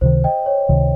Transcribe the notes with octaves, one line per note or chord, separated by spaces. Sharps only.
C#2 C3 D#3 C5
D#5 G5
C#5
C#2 C3 D#3